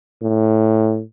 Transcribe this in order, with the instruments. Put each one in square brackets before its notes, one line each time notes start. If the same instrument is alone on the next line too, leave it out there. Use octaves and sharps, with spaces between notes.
[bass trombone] A2